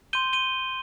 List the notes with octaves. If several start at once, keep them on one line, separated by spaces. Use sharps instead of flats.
C6 G6 D#7 G7
D#7 G7